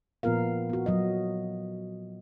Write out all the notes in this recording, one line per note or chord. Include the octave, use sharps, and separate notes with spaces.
A#2 F3 B3 F4 A#4 F5
B3 F#4
F#3 F#4 D#5